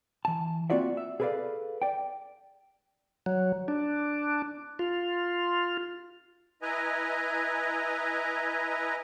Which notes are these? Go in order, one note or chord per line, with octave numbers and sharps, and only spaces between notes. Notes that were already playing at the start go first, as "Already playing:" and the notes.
E3 A5
A#3 C4 F4 F#4 D5 E5
E5
G#4 A4 B4 C5 D5 F5
D5 G5
F#3
D4
F4
E4 B4 D#5 G#5 A#5